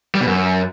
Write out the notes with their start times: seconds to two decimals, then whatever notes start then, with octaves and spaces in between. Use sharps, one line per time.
0.15 G3
0.20 B2
0.26 F#2